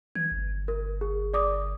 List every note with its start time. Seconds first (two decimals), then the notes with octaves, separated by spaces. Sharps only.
0.15 E3 G#6
0.32 G1
0.68 A#4
1.01 G#4
1.34 D5 D6 D#6